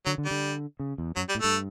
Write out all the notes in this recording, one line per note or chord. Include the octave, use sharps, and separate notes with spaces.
D3 F#3
D3
G3
D3
C#3
E2
F#2 F#3
G3
A2
G2 A3